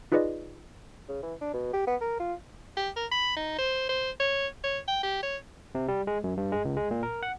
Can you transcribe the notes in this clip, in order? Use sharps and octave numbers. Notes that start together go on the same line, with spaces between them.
D#4 F4 G#4 B4 D5 D#5
C#3
E3
D4
B2
G4
B3
A#4
F4
G4
A#4
B5
D#4
C5
C5
C#5
C#5
G5
G4
C#5
C3
G3
G#3
F#2
G2
G#3
C#2
G#3
A#2
A#4
F#5